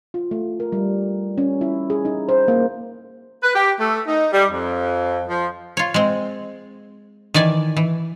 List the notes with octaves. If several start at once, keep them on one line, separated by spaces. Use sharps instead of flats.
F4
A3
A#4
G3
C#4
E4
G#4
D#4
C5
A#3
B4
G4
A3
D#4
G3
F2
F3
F4 C#5
G#3 C4
D#3 E3 D5 G#5
E3